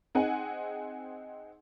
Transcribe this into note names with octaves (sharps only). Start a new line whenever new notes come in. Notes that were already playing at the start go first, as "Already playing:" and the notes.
C4 D#4 G#4 D#5 F#5 G#5